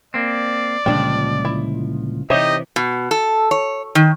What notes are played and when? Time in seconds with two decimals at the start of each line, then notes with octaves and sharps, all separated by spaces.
0.14 A#3 C4 D5
0.86 C#2 F#2 A#2 D3 F3 G3 D4 G5
1.45 E4
2.30 C3 E3 D#4 G4 C5 C#5 D#5 E5
2.76 B2
3.11 A4
3.51 C#5
3.95 D#3